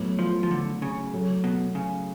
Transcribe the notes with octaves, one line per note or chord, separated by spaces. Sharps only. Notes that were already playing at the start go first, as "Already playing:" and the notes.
Already playing: A2 F#3 B3
F3
F3
D3
C#3
A2 F#3 A3
B2
C#3